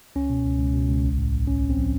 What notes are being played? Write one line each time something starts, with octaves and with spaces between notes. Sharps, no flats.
C#2 C#4
B2
C#2
C#2
B2
C#2
A#1
A2
A#1
A#1 C#4
A#1
C4
F3